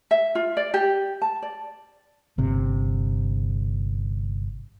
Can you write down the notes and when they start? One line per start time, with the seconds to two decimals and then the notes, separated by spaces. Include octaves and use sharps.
0.11 E5
0.35 F4
0.57 D5
0.74 G4
1.22 A5
1.42 D5
2.38 G1 C3